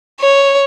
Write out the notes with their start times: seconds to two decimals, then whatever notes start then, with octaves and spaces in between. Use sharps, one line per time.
0.21 C#5